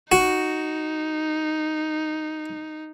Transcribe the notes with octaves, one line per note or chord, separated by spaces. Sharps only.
D#4 F#4